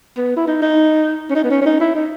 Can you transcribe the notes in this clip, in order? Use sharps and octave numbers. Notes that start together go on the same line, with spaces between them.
B3
E4
D#4
D#4
C#4
D#4
B3
C#4
C#4
D#4
E4
D#4